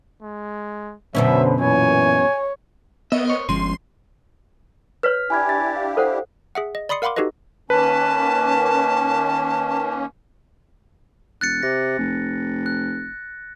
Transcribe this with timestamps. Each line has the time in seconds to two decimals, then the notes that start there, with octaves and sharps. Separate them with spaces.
0.22 G#3
1.15 F#2 B2 D3 F#3 C#4 C5 E5
1.61 A#2 E3 C#5 G#5
3.12 B3 A#4 C#5 D#5 E5
3.25 A#4 C5 C#5
3.49 G1 F3 G#3 C#4 C6
5.03 B4 C#5 F6 B6
5.30 D4 E4 G4 G#5 B5 G#6
5.49 A6
5.77 F5
5.97 A4 C5 F#5
6.55 G#4 E5 F#5
6.75 D#5
6.89 D5 B5 C6 D#6 C7 C#7
7.02 A#4 F5 F#5 B5 C6 D6
7.16 D#4 F#4 G4 A4 B4 D#5
7.70 D#3 A#3 C#4 B4 A5
11.41 E1 F#6 A6 C#7
11.63 C3 A#6
11.98 F1
12.66 F#6